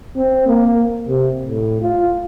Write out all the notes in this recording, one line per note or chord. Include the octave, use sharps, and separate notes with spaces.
C4
A#3
C3
A2
F4